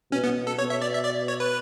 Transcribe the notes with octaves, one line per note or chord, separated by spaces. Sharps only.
B2 C#4
B3
A4
B2 C#5
E5
D5
E5
D5
C#5
B4